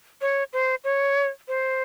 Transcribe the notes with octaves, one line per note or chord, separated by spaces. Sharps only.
C#5
C5
C#5
C5